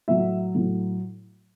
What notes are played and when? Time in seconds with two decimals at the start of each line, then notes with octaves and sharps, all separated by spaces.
0.08 A2 F#3 E5
0.55 A2 F#3